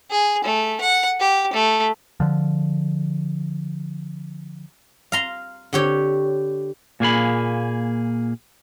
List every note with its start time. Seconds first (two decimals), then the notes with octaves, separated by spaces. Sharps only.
0.11 G#4
0.45 A3
0.81 F#5
1.20 G4
1.53 A3
2.20 D3 F3
5.12 F5 A#5 C6
5.73 D3 G4 C#5
7.00 A#2 A#3 G#4 B5